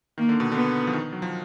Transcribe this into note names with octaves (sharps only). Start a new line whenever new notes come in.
D#3 A#3
D3
B2
D3 B3
F3
D#3
F#3
F3